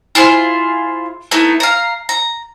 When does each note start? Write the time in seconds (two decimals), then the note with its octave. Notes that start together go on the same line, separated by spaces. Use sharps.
0.15 E4 F4 G#4 C5
1.31 A3 B3 D#4 E4
1.60 F5 A#5
2.09 A#5